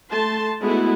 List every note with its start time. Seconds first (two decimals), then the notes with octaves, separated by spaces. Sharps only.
0.12 A3 A5 C6
0.62 G#3 A3 B3 E4 F#4